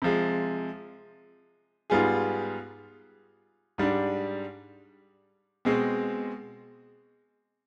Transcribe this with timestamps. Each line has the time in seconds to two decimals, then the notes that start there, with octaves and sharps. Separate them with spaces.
0.02 C3 F3 G#3
1.90 G#2 G3 B3 F4 G#4
3.78 G#2 G3 D4
5.65 B2 G#3 C4